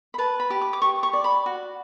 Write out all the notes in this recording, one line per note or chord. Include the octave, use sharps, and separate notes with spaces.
B5
B4 A5
B5
G4
D6
D6
G4 C#6
C#6
D5
B5
F#4